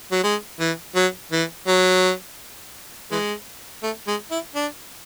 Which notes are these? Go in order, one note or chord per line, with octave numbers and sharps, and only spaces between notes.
F#3
G#3
E3
F#3
E3
F#3
E3 G#3
A3
G#3
E4
D4